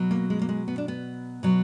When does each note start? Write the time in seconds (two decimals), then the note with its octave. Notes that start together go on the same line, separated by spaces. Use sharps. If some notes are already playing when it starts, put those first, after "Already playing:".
Already playing: B2 F#3
0.11 A#3
0.30 G#3
0.42 A#3
0.49 G#3
0.68 B3
0.78 D4
0.88 B3
1.43 B2 F#3